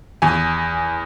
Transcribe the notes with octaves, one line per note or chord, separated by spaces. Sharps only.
E2 G#5